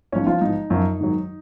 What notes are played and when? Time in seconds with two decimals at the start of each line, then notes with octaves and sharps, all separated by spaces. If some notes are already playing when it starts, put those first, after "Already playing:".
0.12 G#2 F3 C#4 C#5
0.27 F3 F4
0.41 G#2 F3 D#4
0.70 F#2 F3
1.00 G#2 D#3 F#3